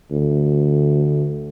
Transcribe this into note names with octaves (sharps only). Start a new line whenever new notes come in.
D2